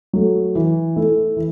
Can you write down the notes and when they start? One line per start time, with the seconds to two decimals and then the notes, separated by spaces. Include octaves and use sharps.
0.13 F#3 A3
0.55 E3
0.96 A3 E4 A4
1.36 E3